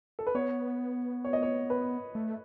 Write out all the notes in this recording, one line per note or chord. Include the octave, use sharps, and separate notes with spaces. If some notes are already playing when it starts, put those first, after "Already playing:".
A4
B4
B3 C#5
C#5
D#5
C#5
B4
A3